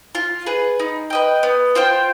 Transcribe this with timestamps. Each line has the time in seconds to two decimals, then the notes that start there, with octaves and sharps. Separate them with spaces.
0.15 F4
0.46 G#4 B4
0.79 D#4
1.10 B4 D#5 G5
1.43 B3
1.75 F4 C5 G5